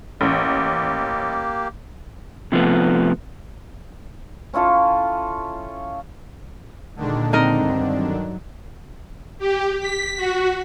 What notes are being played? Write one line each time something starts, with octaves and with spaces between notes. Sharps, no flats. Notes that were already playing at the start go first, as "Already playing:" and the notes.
A1 A#3 G4
C3 F3 A3 B3
C#4 E4 F4 A4
A#2 D3 D#3 G#3 D4
C4 D#4 A#4 D#5
G2
F#3
G4
B6
F#4